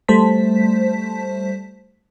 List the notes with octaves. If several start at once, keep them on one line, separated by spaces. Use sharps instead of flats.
G3 A3 C5 A5 B6